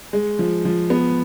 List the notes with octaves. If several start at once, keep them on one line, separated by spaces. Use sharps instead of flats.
G#3
F3
F3
B3